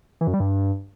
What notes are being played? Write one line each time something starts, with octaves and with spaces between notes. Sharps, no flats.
E3
F#2
G3
G2